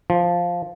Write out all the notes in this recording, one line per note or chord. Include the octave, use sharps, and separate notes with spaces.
F3